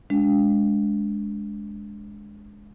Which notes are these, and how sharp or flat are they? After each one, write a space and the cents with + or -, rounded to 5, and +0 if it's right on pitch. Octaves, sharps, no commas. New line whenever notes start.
G#3 +0 D4 -25